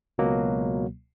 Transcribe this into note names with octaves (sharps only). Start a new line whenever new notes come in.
C#2 B2 F#3 A#3